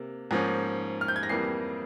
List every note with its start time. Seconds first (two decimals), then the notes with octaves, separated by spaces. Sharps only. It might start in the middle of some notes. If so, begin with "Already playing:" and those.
Already playing: C3 A#3
0.31 G#2 F3 A#3 C#4
1.01 F6
1.08 G6
1.16 G#6
1.23 A#6
1.29 F2 E3 G3 A#3 C7